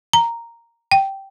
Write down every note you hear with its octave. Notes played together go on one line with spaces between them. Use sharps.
A#5
G5